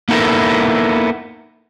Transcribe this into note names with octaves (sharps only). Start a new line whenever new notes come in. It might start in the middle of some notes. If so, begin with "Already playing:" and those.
A#3 B3 D#4 E4 A4 A#4